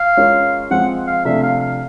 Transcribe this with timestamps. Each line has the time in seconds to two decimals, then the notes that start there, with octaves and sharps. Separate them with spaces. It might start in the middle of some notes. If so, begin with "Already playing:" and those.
Already playing: F5
0.17 G#3 C#4 F4 A#4 C#5
0.71 F3 G#3 C4 F#5
1.07 F5
1.25 C3 F3 A3 D4 E5
1.43 F5
1.61 F5